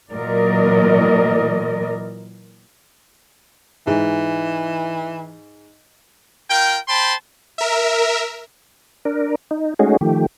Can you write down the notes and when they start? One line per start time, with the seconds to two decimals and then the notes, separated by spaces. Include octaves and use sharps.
0.13 A#2 E3 F#3 A#4 D5 D#5
3.87 G#2 E3
6.49 F4 A#4 G5
6.88 C5 G5 A5 B5 C6
7.58 A#4 E5
9.05 D4 A#4
9.51 D#4
9.79 G#3 A3 C#4 D#4 F#4 G#4
10.01 D#3 F3 A3 G4